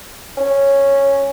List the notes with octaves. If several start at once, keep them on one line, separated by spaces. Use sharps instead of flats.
C#4